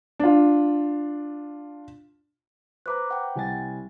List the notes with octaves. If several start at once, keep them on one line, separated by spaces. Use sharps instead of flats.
D4 F4
B4 C5 A#5 D6 F#6
F#5 G5
C2 G#5 A6